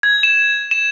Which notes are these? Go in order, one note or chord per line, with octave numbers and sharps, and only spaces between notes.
G#6
E7
E7